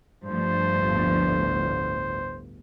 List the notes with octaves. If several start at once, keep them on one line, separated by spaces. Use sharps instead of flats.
G2 F3 A3 C5
G1 D2 A2